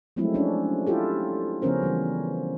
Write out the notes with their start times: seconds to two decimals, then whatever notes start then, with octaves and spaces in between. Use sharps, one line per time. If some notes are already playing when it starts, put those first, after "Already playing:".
0.16 F3 F#3 G#3 A3 C4 E4
0.34 C#4 D4
0.87 E4 F4 G4 A4
1.62 C#3 F3 B3 C#4 A#4 C5
1.82 E3 G3